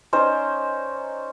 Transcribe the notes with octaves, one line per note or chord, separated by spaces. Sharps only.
C#4 D#4 C5 D5